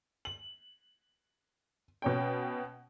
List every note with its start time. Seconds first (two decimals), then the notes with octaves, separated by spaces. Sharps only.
0.25 F#7
2.02 B2 C#4 G5